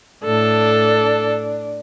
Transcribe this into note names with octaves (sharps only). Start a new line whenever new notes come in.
A2 D4 A4